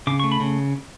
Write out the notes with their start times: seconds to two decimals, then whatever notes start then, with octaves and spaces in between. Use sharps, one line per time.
0.07 C#3 D6
0.20 C#6
0.24 A3
0.32 B5
0.40 C#3